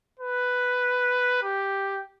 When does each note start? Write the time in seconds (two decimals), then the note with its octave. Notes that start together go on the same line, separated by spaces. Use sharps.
0.20 B4
1.43 G4